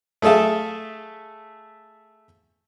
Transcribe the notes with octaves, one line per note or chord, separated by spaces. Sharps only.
A3 G#4 A4 E5 F5